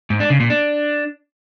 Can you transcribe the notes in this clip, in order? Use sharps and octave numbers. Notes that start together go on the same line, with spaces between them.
G#2
D4
C#3
A#2
D4